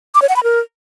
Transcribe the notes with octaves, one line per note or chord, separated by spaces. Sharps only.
D6
C#5
F#5
B5
A#4